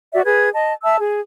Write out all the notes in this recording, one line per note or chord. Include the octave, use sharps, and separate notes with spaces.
F#4 D5 E5
G#4 B4 G#6
D#5 A5
E5 A5 E6
G#4